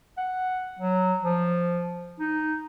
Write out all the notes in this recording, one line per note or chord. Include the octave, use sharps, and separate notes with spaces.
F#5
F#3
F3
D#4